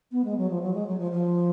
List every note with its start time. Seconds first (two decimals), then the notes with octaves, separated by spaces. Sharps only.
0.12 B3
0.24 G#3
0.38 F#3
0.50 F3
0.62 F#3
0.74 G#3
0.87 F#3
0.99 F3
1.11 F3